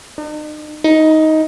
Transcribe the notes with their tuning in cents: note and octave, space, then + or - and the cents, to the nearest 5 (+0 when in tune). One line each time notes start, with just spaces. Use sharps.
D#4 -45
D#4 +15